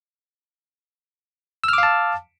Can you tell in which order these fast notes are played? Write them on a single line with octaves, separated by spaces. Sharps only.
E6 F6 D6 F5 A5